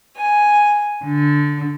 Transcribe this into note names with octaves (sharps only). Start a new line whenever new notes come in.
G#5
D3